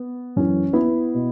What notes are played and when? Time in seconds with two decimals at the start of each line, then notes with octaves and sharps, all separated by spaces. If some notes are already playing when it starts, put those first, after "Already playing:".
Already playing: B3
0.36 F#2 E3 C#4
0.73 B3 E4
1.14 B2